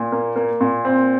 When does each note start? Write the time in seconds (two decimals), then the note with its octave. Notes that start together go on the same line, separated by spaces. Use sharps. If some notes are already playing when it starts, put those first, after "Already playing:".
Already playing: A#2
0.12 A#3
0.36 A#3
0.61 A#2
0.85 C4